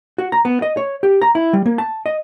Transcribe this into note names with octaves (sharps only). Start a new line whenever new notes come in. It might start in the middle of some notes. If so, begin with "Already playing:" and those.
F#4
A#5
B3
D#5
C#5
G4
A#5
E4
G3
A#3
A5
D#5